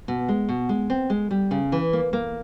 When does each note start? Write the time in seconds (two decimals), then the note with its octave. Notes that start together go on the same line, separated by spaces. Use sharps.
0.08 B2
0.28 G#3
0.49 B2
0.69 G#3
0.90 C4
1.10 G#3
1.31 G3
1.51 C#3
1.72 E3
1.93 A#3
2.13 A#3